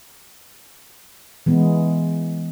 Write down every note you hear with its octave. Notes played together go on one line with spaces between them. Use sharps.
E3 G#3 B3